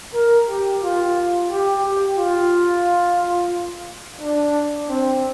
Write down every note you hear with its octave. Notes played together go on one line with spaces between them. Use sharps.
A#4
G4
F4
G4
G4
F4
D4
C4